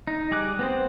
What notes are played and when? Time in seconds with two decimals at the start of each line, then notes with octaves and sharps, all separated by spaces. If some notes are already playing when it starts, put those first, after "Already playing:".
0.07 D#4
0.31 G3 G#4 D6 F#6
0.59 B3 C4 C5